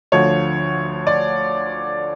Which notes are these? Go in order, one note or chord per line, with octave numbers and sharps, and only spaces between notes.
D2 D3 F3 C#5
D5